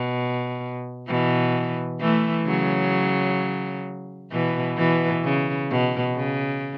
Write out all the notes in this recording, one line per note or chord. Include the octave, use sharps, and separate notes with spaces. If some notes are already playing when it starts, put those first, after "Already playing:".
Already playing: B2
B2 E3
E3 A3
C#3 F#3
B2 E3
B2 E3
C#3
B2
C#3